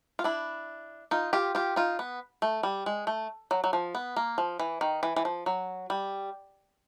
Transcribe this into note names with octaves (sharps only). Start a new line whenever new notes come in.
F4
D4 E4
D#4 F4
F4 G4
F4 G4
D#4 F4
B3
A3
G3
G#3
A3
F#3
F#3
F3
B3
A#3
F3
E3
D#3
E3
E3
F3
F#3
G3